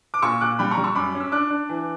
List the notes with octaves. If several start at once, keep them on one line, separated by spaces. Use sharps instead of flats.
D6
A#2 C#6 E6
A#2 D6 F#6
G3 G5 B5
A#5 C#6
G3
C#6 E6
F#2 B5 D6
C#4
E6
D4 D6 F#6
D4
E3